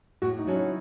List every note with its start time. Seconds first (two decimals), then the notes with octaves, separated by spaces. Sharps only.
0.22 A2 F#4
0.39 D#4
0.47 F#3 C#4 F#4 A4
0.55 E4